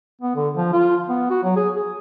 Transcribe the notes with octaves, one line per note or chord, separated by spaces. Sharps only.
B3
D3
F3
F4
B3
F#4
F#3
G#4
G#4